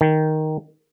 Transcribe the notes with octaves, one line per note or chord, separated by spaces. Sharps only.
D#3